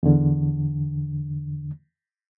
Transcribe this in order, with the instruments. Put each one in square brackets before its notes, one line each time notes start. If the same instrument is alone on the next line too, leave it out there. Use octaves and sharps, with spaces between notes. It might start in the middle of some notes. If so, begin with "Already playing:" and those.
[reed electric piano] E2 D3